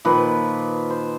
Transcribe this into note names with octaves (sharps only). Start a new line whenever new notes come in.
A#2 D#3 F3 B4
C5